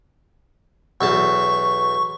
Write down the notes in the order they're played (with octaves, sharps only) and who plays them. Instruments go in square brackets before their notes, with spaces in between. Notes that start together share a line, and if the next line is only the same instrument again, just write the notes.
[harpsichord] B1 E2 A5 [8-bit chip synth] C#6